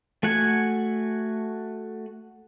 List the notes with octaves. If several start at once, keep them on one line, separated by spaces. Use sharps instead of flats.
A3 F#4 F#5 G#5